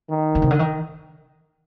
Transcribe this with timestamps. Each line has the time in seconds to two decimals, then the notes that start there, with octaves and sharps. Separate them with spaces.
0.09 D#3
0.35 D3
0.42 C3
0.51 D3
0.59 D#3